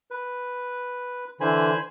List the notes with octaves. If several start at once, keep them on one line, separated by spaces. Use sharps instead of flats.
B4
D3 E3 C5 G#5 B5